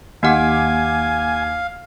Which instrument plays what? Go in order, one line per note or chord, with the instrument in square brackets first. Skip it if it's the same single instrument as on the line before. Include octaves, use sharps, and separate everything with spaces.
[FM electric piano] D#2 D#3 D6 [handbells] A#3 G4 F#5 [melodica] F5 [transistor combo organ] G#5